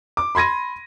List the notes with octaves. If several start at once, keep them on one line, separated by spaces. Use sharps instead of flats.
D6
B5 C6 G#6 A#6 D#7